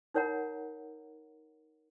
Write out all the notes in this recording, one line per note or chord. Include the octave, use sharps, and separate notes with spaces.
D#4 A#4 C#5 F#5 A#5